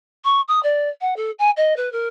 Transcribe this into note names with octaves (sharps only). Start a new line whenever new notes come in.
C#6
D#6
D5
F#5
A4
G#5
D#5
B4
A#4